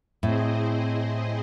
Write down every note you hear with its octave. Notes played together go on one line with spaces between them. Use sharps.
A2 C4 E4 G#4 C5 D#5